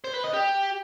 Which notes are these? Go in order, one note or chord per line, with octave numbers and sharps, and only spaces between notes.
C5
B4
D#5
G4